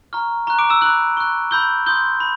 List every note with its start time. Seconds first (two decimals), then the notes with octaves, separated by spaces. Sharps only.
0.13 A#5 C#6 F6
0.47 A#5 C#6 F#6
0.59 D6 D7
0.70 E6 E7
0.81 B5 D6 F#6 F#7
1.17 C#6 F#6
1.51 B5 E6 G6 G7
1.86 C6 D#6 G6 G7
2.20 B5